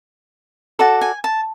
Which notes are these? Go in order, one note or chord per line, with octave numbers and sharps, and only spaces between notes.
F#4 A4 D5 A5
G#5
A5